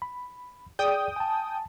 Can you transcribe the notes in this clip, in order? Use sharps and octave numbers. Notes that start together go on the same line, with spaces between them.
B5
G#4 D5 G5 D#6
G#5 A5